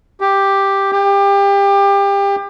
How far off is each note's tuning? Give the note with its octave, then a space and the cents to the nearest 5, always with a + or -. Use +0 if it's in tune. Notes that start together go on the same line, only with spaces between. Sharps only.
G4 +5
G4 +25